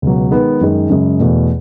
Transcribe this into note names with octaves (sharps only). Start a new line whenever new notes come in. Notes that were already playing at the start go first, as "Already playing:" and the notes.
C#2 B2 F#3
D#3 G#3 B3
F#2 D#3 G#3
F#2 C#3 G#3
E2 B2 A3